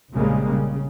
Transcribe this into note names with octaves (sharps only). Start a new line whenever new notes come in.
F1 A#1 C#3 G3 G#3 A#3
C#3